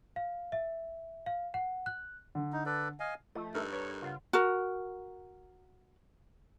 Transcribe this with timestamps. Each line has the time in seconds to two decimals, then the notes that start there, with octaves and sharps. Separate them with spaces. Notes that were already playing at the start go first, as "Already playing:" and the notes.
0.16 F5
0.52 E5
1.26 F5
1.54 F#5
1.86 F#6
2.35 D3
2.53 D#4
2.66 A4 B4 D5
3.00 D#5 F5 G#5
3.35 F3 A3 D#5
3.55 G2 D#4 A4 A#4 E6 F6
3.72 B4 C#5
4.02 C#3 F4 F#5
4.33 F#4 A#4